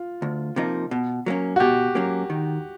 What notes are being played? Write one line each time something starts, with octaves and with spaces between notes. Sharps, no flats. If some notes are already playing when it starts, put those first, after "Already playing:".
Already playing: F4
D2
C3 F3 A#3 D#4
B2
F#3 A#3 C#4
F#4
B2 G4
F#3 A#3 C#4
D#3